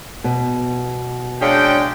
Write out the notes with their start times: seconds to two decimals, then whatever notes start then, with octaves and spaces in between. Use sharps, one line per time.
0.24 B2
1.41 C#3 G#3 D4 G5